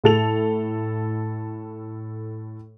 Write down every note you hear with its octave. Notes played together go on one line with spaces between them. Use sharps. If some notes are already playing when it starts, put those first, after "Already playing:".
A2 A4 F7